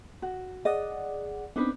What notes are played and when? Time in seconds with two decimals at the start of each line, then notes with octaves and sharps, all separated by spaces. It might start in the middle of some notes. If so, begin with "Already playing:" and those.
0.22 F#4
0.65 G#4 D5 D#5 F#5
1.56 B3 C4 D4 D#4 B4